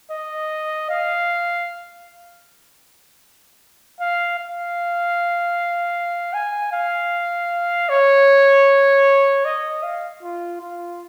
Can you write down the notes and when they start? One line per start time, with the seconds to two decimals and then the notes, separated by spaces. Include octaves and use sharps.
0.12 D#5
0.90 F5
4.00 F5
4.39 F5
6.34 G#5
6.72 F5
7.89 C#5
9.45 D#5
9.83 F5
10.23 F4
10.61 F4